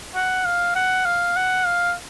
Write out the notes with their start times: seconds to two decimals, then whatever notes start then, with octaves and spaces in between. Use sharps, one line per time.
0.15 F#5
0.46 F5
0.75 F#5
1.06 F5
1.36 F#5
1.66 F5